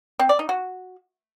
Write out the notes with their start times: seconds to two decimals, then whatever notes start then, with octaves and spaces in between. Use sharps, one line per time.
0.19 C4
0.29 D5
0.39 D#4
0.49 F#4